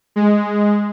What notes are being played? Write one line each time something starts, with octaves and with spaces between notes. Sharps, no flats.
G#3